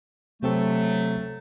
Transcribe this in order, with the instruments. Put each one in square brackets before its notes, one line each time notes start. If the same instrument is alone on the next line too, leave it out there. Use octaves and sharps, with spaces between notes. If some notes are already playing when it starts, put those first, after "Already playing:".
[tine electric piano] C3 C4 A4 [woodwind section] F#3 A3